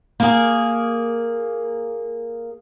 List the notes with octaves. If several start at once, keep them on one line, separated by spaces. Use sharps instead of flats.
A#3 G#4